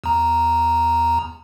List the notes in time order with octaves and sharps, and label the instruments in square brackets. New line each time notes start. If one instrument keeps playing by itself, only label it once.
[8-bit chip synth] E2 A#5